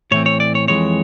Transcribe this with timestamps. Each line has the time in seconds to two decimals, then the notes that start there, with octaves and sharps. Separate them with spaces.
0.11 A2 E3 A3 C4 C#5
0.26 C#5
0.40 D5
0.55 C#5
0.68 F2 C3 E3 G#3 C#5